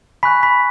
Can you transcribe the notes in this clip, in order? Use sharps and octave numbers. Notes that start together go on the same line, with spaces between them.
G#5 B5 C#6 F#6 B6
B5 B6